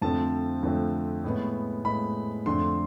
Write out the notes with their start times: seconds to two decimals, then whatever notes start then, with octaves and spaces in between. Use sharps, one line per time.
0.02 F2 D3 F3 A3 C4 A5
0.63 F2 D3 F3 A3 C4
1.24 A2 G#3 B3
1.85 A2 G#3 B3 B5
2.46 F2 D3 A3 D4 C6